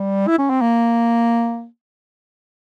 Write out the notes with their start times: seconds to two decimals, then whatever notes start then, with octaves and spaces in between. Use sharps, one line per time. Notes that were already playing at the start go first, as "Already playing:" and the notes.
Already playing: G3
0.28 E4
0.38 C#4
0.50 C4
0.61 A#3